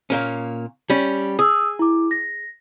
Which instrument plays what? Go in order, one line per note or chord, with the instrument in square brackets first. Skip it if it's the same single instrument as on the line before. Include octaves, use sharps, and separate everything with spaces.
[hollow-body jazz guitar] A#2 A#3 C#4
G3 C#4
[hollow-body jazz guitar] G#4 [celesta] D#6 E6
[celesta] E4 D6
A#6